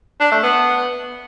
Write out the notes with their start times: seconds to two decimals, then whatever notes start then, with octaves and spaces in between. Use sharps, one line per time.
0.20 D4
0.31 A3
0.43 B3